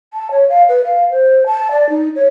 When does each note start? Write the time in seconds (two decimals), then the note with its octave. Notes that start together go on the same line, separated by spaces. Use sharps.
0.14 A5
0.31 C#5
0.49 F5
0.69 B4
0.85 F5
1.11 C5
1.46 A5
1.71 D5
1.90 D#4
2.16 C#5